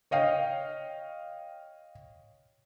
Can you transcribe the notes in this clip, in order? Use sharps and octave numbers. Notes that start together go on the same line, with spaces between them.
C#5 D#5 F5 G5